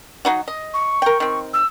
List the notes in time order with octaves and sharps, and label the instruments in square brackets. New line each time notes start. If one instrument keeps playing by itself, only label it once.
[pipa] F#3 D#4 F#4
D#5
[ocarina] C#6
[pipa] A#4 G5
D#3 C4
[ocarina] E6